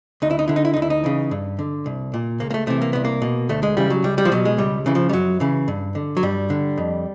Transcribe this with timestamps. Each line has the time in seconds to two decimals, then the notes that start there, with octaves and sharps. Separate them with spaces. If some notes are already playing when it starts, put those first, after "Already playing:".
0.22 D2 D#4
0.31 E4
0.39 D#4
0.48 D3 E4
0.56 D#4
0.65 E4
0.74 D2 D#4
0.82 E4
0.90 D#4
1.04 C#3 E3
1.31 G2
1.59 D3
1.86 C2
2.14 A#2
2.40 C#2 A#3
2.51 A#3
2.54 A3
2.67 C3 E3 A3
2.82 A#3
2.93 C2 B3
3.05 A#3
3.22 B2
3.49 D2 A3
3.63 G#3
3.77 C#3 E3 G3
3.90 F#3
4.04 C#2 G3
4.18 G3
4.25 F3
4.32 B2 F#3
4.45 G#3
4.58 C#2 G3
4.86 C#3 E3
4.95 F3
5.09 G3
5.13 F#2 F#3
5.40 C#3 E3
5.68 G2
5.95 D3
6.17 F#3
6.23 G2 G3
6.50 D3
6.78 F2